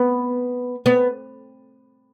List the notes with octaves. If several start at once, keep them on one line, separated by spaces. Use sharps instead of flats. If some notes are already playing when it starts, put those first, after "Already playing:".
Already playing: B3
B3